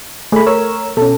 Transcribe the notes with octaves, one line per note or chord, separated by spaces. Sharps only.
A3 G#4 B5
A#4 C#5 E6
B2 C#4 A4